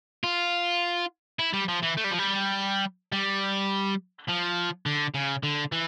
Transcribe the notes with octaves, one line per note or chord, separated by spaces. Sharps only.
F4
E4
G3
F3
E3
A3
G3
F3
G3
G3
F3
D3
C#3
D3
E3